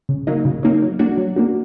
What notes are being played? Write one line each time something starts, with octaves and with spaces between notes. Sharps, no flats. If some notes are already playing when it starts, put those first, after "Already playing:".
C#3
F#3 A#3 D#4
C#3
F#3 A#3 D#4
F#3
A#3 D4 F#4
F#3
A#3 D4 F#4